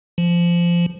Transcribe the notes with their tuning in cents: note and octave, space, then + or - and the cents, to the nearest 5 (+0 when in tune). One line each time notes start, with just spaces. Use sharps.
F3 -15